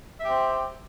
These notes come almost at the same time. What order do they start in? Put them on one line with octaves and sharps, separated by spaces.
E5 G4 C4